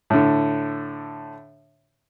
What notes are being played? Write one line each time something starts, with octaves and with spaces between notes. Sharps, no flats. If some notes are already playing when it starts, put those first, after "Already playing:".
A2 D3